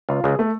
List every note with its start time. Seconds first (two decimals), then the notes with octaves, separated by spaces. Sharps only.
0.09 C#2 F4
0.24 C#2 G#4
0.39 A3